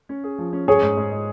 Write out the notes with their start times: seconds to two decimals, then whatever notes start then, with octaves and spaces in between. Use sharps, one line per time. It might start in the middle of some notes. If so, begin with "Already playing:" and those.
0.09 C#4
0.24 G#4
0.38 F3
0.53 C#4
0.67 C#4 G#4 C#5
0.82 G#2
0.97 G#2
1.12 G#3